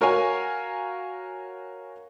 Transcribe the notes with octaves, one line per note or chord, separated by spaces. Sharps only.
F#4 A#4 C#5 F5 F#5 G#5